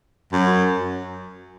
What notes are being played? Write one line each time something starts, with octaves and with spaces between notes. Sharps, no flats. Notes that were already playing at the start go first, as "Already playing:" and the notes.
F#2